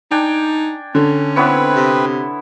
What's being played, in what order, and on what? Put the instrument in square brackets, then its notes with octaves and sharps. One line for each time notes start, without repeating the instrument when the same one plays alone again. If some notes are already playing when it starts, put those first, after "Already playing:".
[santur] D4 G5 G#5 [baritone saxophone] D#4
[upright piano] D3 [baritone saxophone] C#4
[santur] B3 E4 C#5 [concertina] C4 B4
[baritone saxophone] C3